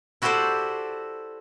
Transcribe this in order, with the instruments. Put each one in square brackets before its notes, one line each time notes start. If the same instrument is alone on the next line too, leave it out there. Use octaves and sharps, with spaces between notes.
[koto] E4 F#4 G4 A4 C5 D5